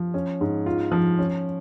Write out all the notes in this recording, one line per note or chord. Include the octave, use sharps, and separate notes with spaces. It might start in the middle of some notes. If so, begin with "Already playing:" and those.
Already playing: F3
C#4
G#2
F4
F3
C#4